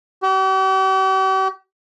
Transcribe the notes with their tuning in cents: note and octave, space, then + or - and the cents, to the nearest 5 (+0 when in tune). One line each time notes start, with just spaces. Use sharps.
G4 -45